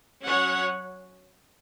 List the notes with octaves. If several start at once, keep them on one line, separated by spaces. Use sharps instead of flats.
F#3 C#4 C#5 F#5